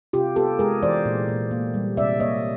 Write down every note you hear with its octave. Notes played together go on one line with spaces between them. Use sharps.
C3 F4 G4
B3 G4 A4
G#3 G#4 A#4
E3 C5 D5
A#2
A#2
A#3
G3
C3 D5 E5
A#3 C#5 D#5